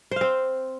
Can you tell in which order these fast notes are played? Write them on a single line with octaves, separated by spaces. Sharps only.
C5 F5 C4